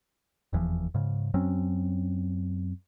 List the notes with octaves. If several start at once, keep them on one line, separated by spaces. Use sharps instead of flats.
F1 E2 E3 F3
G#2 C#3
F#2 F#3 C4 C#4